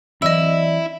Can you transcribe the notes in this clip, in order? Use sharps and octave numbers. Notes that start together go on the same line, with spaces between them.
E3 F#3 C4 E4 D5 D#5 E6